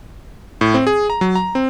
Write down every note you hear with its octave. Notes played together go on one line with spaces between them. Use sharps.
A2
C4
G#4
A#5
F#3
A#5
C4